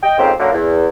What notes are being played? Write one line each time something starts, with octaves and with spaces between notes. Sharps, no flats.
D#5 G5
F2 G#2 C#3 A#3 C4 G4
F#2 D3 F#3 A#3
E2